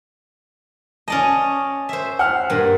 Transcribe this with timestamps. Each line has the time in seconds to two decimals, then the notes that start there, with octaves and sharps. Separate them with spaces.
1.08 C#4 D5 D#5 A5
1.89 C5 E5
2.19 F#5 F6
2.50 G2 A#2